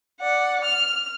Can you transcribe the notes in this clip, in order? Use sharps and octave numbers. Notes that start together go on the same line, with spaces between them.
D5 F#5
F6